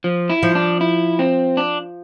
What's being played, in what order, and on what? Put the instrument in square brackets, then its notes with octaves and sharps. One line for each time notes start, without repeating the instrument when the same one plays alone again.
[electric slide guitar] F3
E4
[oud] F3
[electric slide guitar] D4
E4
C4
D4